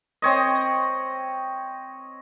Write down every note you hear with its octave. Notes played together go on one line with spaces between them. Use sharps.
C4 C#5 D#5